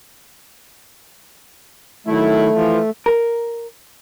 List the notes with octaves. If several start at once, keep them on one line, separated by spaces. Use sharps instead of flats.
D#3 F#3 A3 E4
E3 F3
A#4